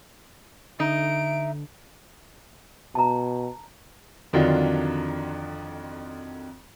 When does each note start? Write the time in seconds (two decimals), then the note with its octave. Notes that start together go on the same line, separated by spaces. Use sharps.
0.80 D3 D#4 E5 D7
2.95 B2 A5 A#5
4.33 F2 D3 D#3 F#3 D4 F4